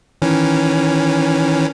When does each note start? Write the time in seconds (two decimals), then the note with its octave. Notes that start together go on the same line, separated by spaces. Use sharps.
0.22 D#3 E3 C#4